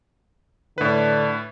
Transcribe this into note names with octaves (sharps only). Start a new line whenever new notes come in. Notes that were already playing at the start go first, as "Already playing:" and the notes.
A2 D3 B4